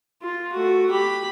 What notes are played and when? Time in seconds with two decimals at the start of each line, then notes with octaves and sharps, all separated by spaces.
0.22 F4
0.52 A3 F#4
0.90 G4 B5